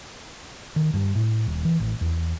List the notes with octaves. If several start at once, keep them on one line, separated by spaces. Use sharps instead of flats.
D#3
G2
A2
D#1
E3
A1
E2